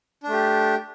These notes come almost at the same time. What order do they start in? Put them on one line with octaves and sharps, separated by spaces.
D4 A3 G4